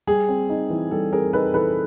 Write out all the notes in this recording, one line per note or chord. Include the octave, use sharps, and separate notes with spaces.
G3 G#4
C4
D#4
E3
G3 A4
C4 G#4 A#4
D#4 A4 B4
E3 A4 B4